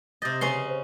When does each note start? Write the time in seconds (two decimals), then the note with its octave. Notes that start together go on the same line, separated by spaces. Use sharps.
0.22 C3 D#5 D#6 G6 A6
0.41 C#3 C#4 B4 C6
0.67 C5 C#5